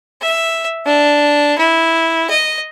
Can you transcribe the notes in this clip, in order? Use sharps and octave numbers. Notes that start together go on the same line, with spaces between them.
E5
D4
E4
D#5